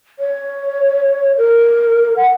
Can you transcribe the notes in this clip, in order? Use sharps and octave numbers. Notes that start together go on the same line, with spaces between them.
C#5
A#4
F#5